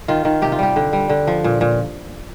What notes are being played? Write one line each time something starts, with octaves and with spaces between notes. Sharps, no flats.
D#3 F4
D#3
C3 G4
F4
G3 G4
D3
G3
D3
F3
A#2
A#2